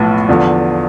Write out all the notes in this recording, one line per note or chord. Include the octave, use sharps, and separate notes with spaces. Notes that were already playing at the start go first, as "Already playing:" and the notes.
Already playing: B1 A2 F3 B3
E2 D3 F3